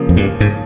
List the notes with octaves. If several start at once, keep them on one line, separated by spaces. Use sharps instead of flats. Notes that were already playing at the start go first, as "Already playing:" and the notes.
Already playing: C#3 F3 A#3
F2
G2
G#2